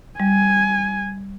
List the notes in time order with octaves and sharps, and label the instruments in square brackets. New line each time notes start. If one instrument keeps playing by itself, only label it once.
[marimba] G3 [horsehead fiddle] G#5